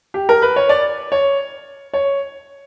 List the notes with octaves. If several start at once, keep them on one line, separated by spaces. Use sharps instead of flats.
G4
A#4
B4
C#5
D5
C#5
C#5